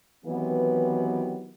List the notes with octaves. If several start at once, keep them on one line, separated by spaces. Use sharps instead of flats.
D#3 E3 F#3 B3 C4 G4